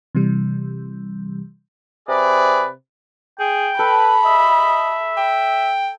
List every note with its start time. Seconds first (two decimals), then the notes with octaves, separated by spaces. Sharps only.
0.15 C3 E3 G3
2.09 C3 G#4 B4 D5
3.40 G#4 G5
3.79 A4 B4 B5
4.25 D#5 E5
5.17 G5